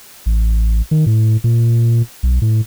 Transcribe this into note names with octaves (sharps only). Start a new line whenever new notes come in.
A1
D#3
A2
A#2
B1
A2